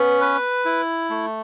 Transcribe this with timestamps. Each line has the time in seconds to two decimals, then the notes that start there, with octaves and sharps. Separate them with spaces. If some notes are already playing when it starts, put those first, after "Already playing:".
Already playing: B3 C#4
0.21 B4
0.65 E4
1.10 A3